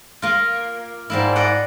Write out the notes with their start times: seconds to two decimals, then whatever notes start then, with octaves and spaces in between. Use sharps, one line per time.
0.22 A#3 F4
1.10 G#2 G3 A#3 E4
1.36 D5 D#5 F#5